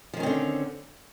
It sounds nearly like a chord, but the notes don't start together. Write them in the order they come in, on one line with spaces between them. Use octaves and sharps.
F3 D#3 C#4 C4 D3